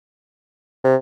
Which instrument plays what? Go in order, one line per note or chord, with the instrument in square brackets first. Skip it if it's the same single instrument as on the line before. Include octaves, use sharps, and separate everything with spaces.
[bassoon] C3